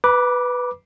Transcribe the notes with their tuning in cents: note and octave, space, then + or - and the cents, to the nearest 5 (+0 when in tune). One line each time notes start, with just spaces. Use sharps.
B4 +0 B5 -40 D6 +0